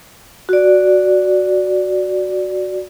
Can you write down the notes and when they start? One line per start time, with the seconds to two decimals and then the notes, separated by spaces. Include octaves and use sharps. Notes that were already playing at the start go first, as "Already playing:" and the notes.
0.49 F#4 D5